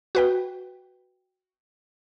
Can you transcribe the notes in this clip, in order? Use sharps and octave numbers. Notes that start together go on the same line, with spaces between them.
F#4 B4 G5